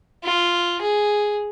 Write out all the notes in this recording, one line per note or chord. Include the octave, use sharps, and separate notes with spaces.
F4
G#4